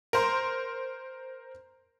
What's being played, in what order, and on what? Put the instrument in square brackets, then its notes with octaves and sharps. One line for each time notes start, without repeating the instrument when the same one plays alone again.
[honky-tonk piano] A#4 C5